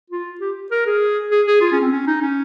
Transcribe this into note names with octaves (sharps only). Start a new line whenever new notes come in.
F4
G4
A#4
G#4
G#4
G#4
F4
C#4
C4
C#4
D#4
C#4